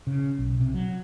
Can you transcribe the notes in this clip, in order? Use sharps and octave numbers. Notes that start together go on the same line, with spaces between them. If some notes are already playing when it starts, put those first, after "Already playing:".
C#3
B1
C3
F#3